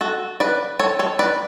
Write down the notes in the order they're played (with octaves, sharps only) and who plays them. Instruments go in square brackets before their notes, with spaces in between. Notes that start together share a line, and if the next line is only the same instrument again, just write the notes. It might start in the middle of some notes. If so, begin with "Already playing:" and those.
[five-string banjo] F#4 A4
B4 D5
A4 C#5
A4 C#5
B4 D5